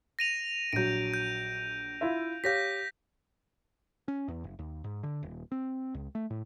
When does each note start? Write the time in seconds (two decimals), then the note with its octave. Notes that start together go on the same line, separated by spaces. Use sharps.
0.19 A#6 D#7 F7
0.73 A#1 F#3 G6 D7
1.14 G6
2.01 E4 F4 E5
2.44 G4 C#5 F5 G6 A#6 B6
4.08 C#4
4.28 E2
4.44 F#1
4.59 D#2
4.84 G#2
5.03 D3
5.23 D#1
5.52 C4
5.95 C#2
6.15 A3
6.30 A2